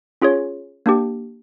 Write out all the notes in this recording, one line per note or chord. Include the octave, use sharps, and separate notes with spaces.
C#4 F4 G#4 C#5
A#3 D4 G4